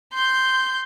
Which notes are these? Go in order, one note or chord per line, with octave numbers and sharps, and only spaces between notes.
C6 G6